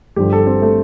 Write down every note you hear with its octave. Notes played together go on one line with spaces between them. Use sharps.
G1 G2 D3 F3 G4
A4
C4
A3